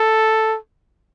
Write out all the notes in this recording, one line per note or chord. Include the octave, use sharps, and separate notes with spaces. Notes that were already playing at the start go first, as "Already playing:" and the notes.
Already playing: A4